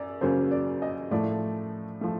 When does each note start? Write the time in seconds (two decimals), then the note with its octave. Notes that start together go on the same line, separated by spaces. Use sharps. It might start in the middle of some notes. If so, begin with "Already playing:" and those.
Already playing: F#2 D5
0.21 F#2 C#3 F#3 A#3 C#4 C5
0.51 D5
0.82 D#5
1.11 A2 F3 A3 D5
2.01 F3 A3